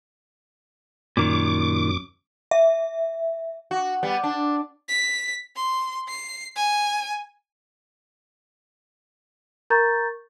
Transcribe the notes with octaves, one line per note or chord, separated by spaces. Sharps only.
F#2 A#2 D#3 D6
E5
F#4
G3 B3
D4
B6
C6
C7
G#5
A#4 A#5 C#6 G6 A6